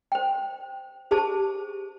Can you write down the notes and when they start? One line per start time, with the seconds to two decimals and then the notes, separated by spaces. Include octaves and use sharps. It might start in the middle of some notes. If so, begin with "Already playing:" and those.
0.12 C5 G5
1.11 G4 G#4 C5 A5